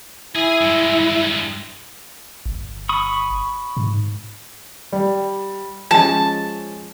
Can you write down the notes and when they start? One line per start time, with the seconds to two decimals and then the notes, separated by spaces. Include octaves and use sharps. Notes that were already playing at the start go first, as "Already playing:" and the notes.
0.35 E4 G#4 G#5
0.61 G2 G#3
2.46 G1
2.89 B5 C#6 D#6
3.77 G#2
4.92 G3
5.91 F3 G#3 C#4 A5